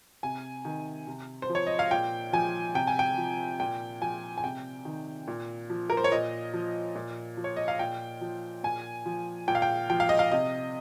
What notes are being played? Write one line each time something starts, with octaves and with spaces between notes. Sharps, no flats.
C3 G#5
D#3
C3
C5
F3
C#5
D#5
F5
A#2 G5
F3 G#5
C3 G5
G#5
G5
F3
A#2 G5
F3 G#5
G#5
C3 G5
D#3
A#2
F3
A#4
C5
C#5
A#2 D#5
F3
A#2
F3
C#5
D#5
F5
A#2 G5
F3
A#2 G#5
F3
A#2 G5
F5
G5
F3 G5
F5
D#5
F5
C3 D#5